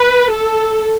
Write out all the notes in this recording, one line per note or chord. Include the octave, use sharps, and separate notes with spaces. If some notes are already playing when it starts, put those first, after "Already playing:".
Already playing: B4
A4